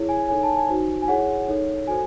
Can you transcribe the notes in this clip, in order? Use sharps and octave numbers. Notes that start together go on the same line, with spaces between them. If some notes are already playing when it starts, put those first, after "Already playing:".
Already playing: E4 G#4 C#5
G#5
D#4 A4 C#5 G#5
A5
G#5
D#4 F#4 C5
G#5
E4 G#4 C#5 F#5
D#4 A4 C#5
F#4 A4 C5 G#5